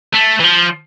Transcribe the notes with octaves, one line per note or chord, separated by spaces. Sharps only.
A3
E3
F3